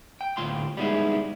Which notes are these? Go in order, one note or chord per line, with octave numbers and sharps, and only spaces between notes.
G5
D2 A2 F4 G5 C6
G3 G#3 B3 D#4 E4 G#4